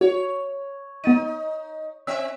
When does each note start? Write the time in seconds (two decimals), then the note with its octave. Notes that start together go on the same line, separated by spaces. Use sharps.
0.01 F#4 C#5
1.04 B3 D#4 A6 D#7
2.07 C4 E5 E6